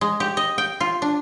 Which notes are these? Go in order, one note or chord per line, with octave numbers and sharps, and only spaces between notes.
G#3
G4
D#5
G5
F4
D4